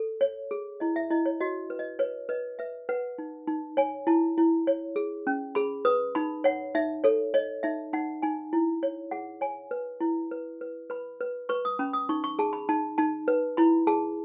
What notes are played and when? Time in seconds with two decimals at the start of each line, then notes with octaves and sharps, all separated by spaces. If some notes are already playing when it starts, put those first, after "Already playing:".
Already playing: A4
0.21 C#5
0.51 G#4
0.80 E4 D#5
0.96 E5
1.11 E4 D#5
1.26 C#5
1.40 F#4 D#5
1.70 B4
1.79 D#5
1.99 B4 C#5
2.29 B4 D#5
2.59 B4 E5
2.89 B4 F#5
3.18 D#4
3.48 D#4
3.77 C#5 G#5
4.07 E4 A5
4.38 E4
4.67 C#5
4.96 G#4
5.27 C#4
5.55 G#4 B5
5.85 B4 D#6
6.15 D#4 B5
6.44 C#5 F#5
6.75 D#4 E5
7.04 A4 C#5
7.34 C#5 D#5
7.63 D#4 E5
7.93 D#4 F#5
8.22 D#4 G#5
8.53 E4
8.83 C#5
9.11 G#4 F#5
9.41 C#5 G#5
9.71 B4
10.01 E4
10.31 B4
10.61 B4
10.90 B4 B5
11.20 B4
11.49 B4 C#6
11.65 D#6
11.79 C#4 B5
11.93 D#6
12.09 D#4 C#6
12.24 C#6
12.39 G#4 A5
12.53 B5
12.69 D#4 A5
12.98 D#4 A5
13.28 B4
13.57 E4 B5
13.87 G#4 A5